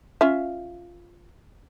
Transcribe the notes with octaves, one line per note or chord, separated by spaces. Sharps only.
C#4 F4 E5